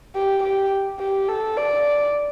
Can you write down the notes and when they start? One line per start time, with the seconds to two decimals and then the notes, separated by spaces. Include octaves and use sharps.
0.15 G4
0.43 G4
0.99 G4
1.28 A4
1.56 D5